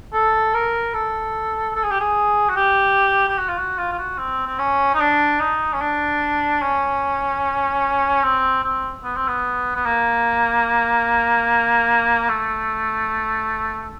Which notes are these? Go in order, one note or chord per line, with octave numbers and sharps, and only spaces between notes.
A4
A#4
A4
A4
G#4
G4
G#4
F#4
G4
G4
F#4
F4
F#4
F4
F4
F#4
C4
C4
C#4
D#4
D4
D#4
C#4
D4
C#4
C4
C4
B3
C4
B3
B3
A#3
A3